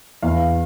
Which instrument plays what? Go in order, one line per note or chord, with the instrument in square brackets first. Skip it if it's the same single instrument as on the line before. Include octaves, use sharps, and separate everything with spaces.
[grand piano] E2 F5